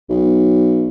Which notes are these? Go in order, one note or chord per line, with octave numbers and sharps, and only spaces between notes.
B1